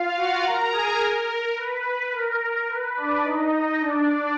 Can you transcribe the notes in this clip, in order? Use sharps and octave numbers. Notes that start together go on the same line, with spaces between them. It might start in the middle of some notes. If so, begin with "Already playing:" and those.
Already playing: F4 F5
F#4 F#5
A#4 A#5
G#4 G#5
A#4
B4
B4
A#4
B4
D4 D5
D#4 D#5
D4 D5